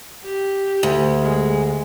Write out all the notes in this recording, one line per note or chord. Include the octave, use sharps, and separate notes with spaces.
G4
D2
G#3